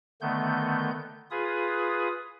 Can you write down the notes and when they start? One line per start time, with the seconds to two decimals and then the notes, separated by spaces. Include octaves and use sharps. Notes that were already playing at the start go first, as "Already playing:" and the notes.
0.21 D3 D#3 A3 B3 G6
1.31 F4 G#4 B4 D#6